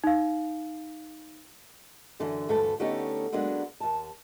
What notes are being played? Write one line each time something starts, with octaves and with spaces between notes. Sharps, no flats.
D#4 F5
F#2 D3 E3
D2 G2 E3 A3 A4
D3 A3 B3 C#4 D#4 G4
F#3 G#3 A#3 B3 D4
D#2 A5